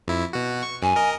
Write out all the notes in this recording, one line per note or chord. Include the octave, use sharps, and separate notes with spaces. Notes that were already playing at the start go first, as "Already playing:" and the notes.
F2 E4
B2 F#4
C#6
F#2 G#5
A#4 D#5